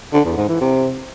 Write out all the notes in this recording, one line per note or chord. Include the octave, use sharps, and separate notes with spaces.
D3
E2
G#2
E3
C3